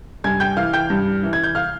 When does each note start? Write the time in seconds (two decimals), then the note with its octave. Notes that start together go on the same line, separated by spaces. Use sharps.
0.24 G2 G#5 G#6
0.40 G5 G6
0.57 E3 F5 F6
0.73 G5 G6
0.90 G2
1.23 E3
1.33 G#6
1.44 G6
1.55 F5 F6